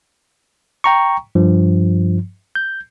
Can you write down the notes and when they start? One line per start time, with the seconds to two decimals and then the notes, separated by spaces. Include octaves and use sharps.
0.84 G5 A#5 C#6
1.35 G2 F3
2.55 G6